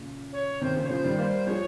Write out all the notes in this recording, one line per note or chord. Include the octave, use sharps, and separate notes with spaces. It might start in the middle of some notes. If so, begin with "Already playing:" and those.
Already playing: A#2 C#3
C#5
C3 D#3 C5
A#2 C#3
C#5
C#3 F3 C5
D#3 G3
G3 A#3 C5
F3 G#3 C#5